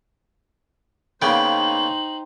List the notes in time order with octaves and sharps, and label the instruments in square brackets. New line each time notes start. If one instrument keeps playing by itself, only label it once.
[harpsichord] C#3 A#3 B3 [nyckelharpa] D#4 C5 [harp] G5 [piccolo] F#7